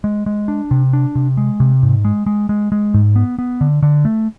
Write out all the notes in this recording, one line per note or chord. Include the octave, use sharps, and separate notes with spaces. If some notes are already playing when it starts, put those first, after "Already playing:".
G#3
G#3
D4
C3
D4
C3
G#3
C3
G#2
G#3
G#3
G#3
G#3
G#2
B3
B3
D3
D3
A3